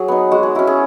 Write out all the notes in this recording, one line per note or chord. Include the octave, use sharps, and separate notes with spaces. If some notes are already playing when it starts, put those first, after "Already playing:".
Already playing: F#3 G#4
B3 D#4
G#3 F#4
G#4
C#4 E4 F#4
G#4